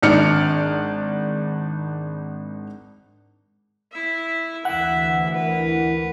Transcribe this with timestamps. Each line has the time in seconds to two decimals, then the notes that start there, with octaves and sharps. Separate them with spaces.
0.03 G#1 D4 D#4 D5 F6 C#7
3.92 E4 E5
4.65 D2 E3 E4 E5 F#5
5.34 E4 A#4 B4